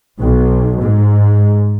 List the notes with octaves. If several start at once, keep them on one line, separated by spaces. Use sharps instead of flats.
B1
G#2